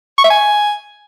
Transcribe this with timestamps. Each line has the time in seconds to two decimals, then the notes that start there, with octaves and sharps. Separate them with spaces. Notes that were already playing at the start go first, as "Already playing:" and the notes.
0.18 C#6
0.24 E5
0.30 G#5